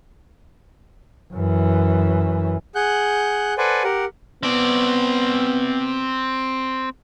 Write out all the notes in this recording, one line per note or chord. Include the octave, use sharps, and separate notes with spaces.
F#2 E3
G#4 F#5 F#6 G6
A4 B4 C5 D5 F#5 G#5
G4 A#4 F#5
B3 C4 D5